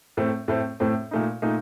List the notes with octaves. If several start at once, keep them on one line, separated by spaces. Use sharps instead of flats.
A2 A3 C4
A2 A3 C4
A2 A3 C4
A#2 A3 D#4
A#2 A3 D#4